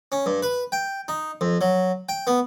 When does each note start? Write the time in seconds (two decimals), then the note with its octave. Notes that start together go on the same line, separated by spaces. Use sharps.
0.12 C#4
0.26 G2
0.42 B4
0.72 G5
1.08 D#4
1.41 F2
1.61 F#3
2.09 G5
2.27 B3